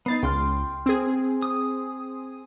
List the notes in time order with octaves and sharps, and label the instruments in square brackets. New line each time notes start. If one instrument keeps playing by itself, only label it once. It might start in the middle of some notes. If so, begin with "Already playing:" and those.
[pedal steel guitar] B3 D#4 [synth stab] A6 C7
[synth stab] C#2 [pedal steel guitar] G5 C6 F6
[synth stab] C4 G#4
[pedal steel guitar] D#6